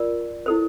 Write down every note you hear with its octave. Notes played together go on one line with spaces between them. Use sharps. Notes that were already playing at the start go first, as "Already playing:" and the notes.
Already playing: F4 A#4 D5
E4 A4 C5